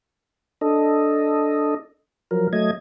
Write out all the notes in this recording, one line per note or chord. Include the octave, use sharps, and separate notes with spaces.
D4 A4 D#5
F3 F#3 A#4
F#3 A3 D#5 G#6